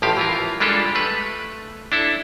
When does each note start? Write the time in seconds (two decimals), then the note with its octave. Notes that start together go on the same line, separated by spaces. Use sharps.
0.02 A1 A2 F3 G4 F5
0.17 E3 F4 A#4
0.60 G3 G#3 D4 F4 G4 A4
0.95 A3 B4
1.92 D4 E4 A4